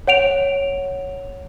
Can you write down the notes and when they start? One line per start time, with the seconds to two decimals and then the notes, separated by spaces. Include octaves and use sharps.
0.07 C#5 F#5 D7 F7